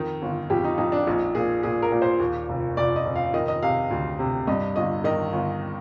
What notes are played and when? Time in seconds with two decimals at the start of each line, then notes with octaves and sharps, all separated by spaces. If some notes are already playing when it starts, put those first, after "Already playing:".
Already playing: F2 D#3
0.22 G1
0.50 F2 G4
0.64 D#4
0.78 F2 D#4
0.92 D4
1.07 A#1 D#4
1.35 A#2 G#4
1.63 A#2 G#4
1.82 A#4
1.92 A#2
2.02 C5
2.20 D#2
2.49 F1
2.77 F1 D5
2.96 D#5
3.05 F1
3.16 F5
3.34 D#3 D#5
3.48 D#5
3.63 C3 F5
3.91 D2
4.19 C3
4.47 G2 D#5
4.76 G1 D#5
5.04 D#3 D#5
5.33 G1